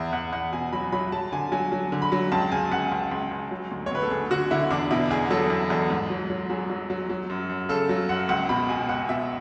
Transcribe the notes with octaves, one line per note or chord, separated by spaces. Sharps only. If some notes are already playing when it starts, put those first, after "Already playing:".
Already playing: E2 E5
E2 F#5
E2 F#5
B2 G#5
F#3 B5
F#3 B5
F#3 A5
D3 G#5
F#3 G#5
F#3
D3
B5
F#3
C#2 A5
C#3 G#5
C#2 F#5
C#2
C#2
C#2
F#3
D2
C#5
D2 B4
A4
D2 G#4
D3 F#4
D3 E4
E2 D4
B2 E4
E2 G#4
F#3 A4
E2
E2 A4
G#2
F#3
F#3
F#3 G#4
F#3
F#3
F#3
F#2
F#2
C#3 A4
F#3
F#2 F#5
C#2 F#5
B2 B5
B2 G#5
C#2 F#5
B2 E5